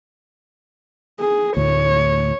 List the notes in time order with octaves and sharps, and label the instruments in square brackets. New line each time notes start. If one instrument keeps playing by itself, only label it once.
[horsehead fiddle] G#4
[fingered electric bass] D2 A2 [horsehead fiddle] C#5